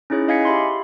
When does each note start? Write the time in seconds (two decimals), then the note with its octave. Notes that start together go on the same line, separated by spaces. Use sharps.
0.10 C#4 D#4 E4 G#4 C#5
0.28 D#5 F5 G#5 G#6 B6 C#7
0.45 G4 E5 B5 C6